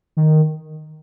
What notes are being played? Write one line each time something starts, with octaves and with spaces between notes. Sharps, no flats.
D#3